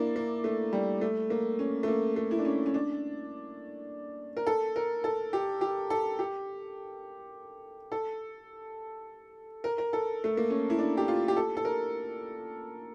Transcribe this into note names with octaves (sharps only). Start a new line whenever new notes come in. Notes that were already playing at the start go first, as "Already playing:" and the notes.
Already playing: A#3 D4 E4
A#3
A3
G3
A3
A#3
C#4
A3
A#3
A3
E4
D4
C#4
C#4
D4
A#4
A4
A#4
A4
G4
G4
A4
G4
A4
A#4
A#4
A4
A3
A#3
C#4
E4
D4
G4
F4
G4
A4
A4
A#4